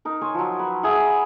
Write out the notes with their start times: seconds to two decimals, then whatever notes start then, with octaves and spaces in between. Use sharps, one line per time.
0.05 D#4 A#4
0.21 C5 C#5 G#5
0.34 F3 F#3
0.59 B4
0.83 G#4 E5 F#5 G#5
1.06 B5